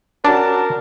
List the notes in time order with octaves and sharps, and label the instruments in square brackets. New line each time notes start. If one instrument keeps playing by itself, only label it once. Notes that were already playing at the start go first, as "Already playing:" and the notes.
[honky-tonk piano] C#4 F#4 [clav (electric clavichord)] D4 [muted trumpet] A#4 [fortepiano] A5